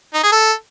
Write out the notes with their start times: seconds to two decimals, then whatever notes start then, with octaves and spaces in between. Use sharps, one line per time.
0.14 D#4
0.23 G#4
0.32 A4